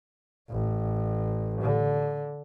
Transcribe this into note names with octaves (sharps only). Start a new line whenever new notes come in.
A1
D3